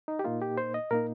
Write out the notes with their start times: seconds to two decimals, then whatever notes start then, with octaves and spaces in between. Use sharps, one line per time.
0.08 D#4
0.19 G4
0.24 A#2 A#3 D#4 F4
0.42 G4
0.58 C5
0.74 D#5
0.91 A#2 A#3 D#4 A#4